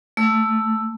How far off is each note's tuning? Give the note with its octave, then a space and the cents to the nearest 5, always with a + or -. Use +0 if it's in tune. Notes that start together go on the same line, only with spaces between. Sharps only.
A3 +0 E6 +5